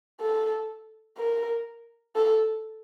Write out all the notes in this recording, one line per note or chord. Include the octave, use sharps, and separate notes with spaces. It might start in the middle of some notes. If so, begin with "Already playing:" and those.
A4
A#4
A4